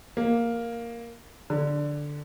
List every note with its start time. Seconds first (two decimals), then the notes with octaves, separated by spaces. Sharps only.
0.17 A#3
1.50 D3